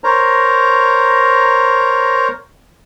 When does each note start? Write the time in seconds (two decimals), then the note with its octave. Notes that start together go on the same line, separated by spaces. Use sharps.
0.04 A#4 C5 C#5 A#5